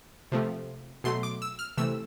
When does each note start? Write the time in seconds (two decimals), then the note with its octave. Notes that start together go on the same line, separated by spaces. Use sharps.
0.32 C3 F3 A3
1.04 B2 F#3 A3 C6
1.23 D6
1.42 E6
1.59 F6
1.77 C3 E3 A3 E6